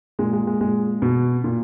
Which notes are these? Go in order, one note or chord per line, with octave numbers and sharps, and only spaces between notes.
A#2 G#3
G#3
G#3
A#2 G#3
B2
A#2